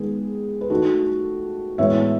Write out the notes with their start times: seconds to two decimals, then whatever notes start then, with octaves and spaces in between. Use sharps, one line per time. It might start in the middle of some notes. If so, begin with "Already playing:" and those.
Already playing: D#3 G#3 B3 G#4
0.61 B4
0.70 D#3 A3 F#4 A4
1.78 A2 E3 G#3 B3 C#5 E5